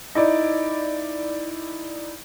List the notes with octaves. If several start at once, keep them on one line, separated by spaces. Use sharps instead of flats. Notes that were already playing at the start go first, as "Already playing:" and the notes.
D#4 E4 D5